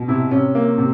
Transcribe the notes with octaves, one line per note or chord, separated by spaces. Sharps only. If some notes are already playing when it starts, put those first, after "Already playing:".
Already playing: B2
C3 E4
C3 C#4
A#3
C3